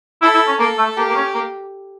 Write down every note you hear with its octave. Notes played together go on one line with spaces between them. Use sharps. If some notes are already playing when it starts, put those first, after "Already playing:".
E4 A4
E4
C#4
A#3 A4
A3
A#3 G4
A#3
C#4
A#3